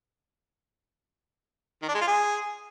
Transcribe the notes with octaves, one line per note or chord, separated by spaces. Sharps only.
D#3
D4
G#3
F4
G#4